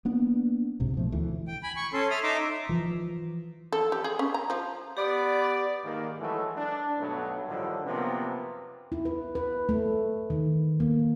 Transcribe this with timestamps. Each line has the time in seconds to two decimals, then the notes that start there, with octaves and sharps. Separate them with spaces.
0.05 A#3 B3 D4
0.80 B1 G#2 C3
0.95 B2 F3 A3
1.12 D2 E3
1.48 G5
1.63 G#5 B5
1.77 C#6
1.93 C#4 A4 C6
2.11 A4 E5 D#6 F6
2.23 D#4 E5 A#5 C6 D6
2.69 E3 F3
3.72 A4
3.92 G4
4.04 G#4
4.19 C#4
4.34 A#5
4.50 F3
4.97 B3 G4 D5
5.84 G#2 D#3 A#3
6.20 E3 F#3 G#3 A3 E4 A4
6.58 D4
7.00 B1 G2 F#3 A3 B3
7.48 A2 D3 D#3 F3 G3
7.85 F#2 C3 F3 A#3 B3
8.92 E4
9.05 B4
9.35 B4
9.69 A3
10.30 D#3
10.80 A#3